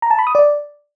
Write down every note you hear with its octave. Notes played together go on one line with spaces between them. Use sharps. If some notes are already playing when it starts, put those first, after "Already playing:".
A#5
A5
B5
D#6
D5